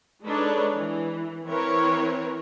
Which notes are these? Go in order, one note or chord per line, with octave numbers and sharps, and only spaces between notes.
G#3 D4 D#4 A4 B4 C#5
E3
E3 C4 E4 A#4 B4 C#5